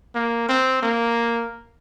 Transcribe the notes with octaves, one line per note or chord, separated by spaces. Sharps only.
A#3
C4
A#3